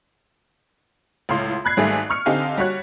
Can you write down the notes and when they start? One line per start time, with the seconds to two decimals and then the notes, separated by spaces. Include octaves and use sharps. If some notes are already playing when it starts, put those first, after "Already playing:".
1.29 C#2 A2 F5 C6
1.65 B5 F#6 G#6 C7
1.77 G#1 G#2 G3 A3 G#4 G#5
2.10 C#6 F6 C#7
2.26 D3 C4 D#4 G4 F5 G#5
2.57 G3 F#4 C#5 F#6